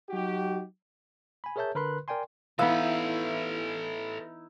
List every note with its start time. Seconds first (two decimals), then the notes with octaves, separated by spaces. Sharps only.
0.10 F#3 D#4 F#4 G4
1.44 G#5 B5
1.56 G#4 A#4 C#5 E5 A5 G6
1.75 D3 A#4 B4 B5 C6 F#6
2.08 A#4 D5 G5 G#5 C6
2.59 E3 B3 D#4 E4 A4 B4 E5 F5